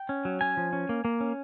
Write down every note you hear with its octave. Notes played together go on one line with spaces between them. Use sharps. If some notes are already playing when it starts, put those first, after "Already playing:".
Already playing: G5
C#4
F#3
C#4 G#5
F3
C#4
A#3
A#3
C#4